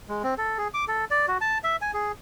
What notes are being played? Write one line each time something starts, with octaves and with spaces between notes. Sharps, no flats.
G#3
C4
A4
G#4
D6
A4
D5
F#4
A5
E5
G#5
G#4